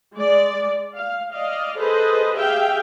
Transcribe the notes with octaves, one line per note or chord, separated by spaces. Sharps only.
G#3 D5
F5
D5 D#5 F5
G#4 A4 B4 C5 D#5
G4 G#4 E5 F5 G5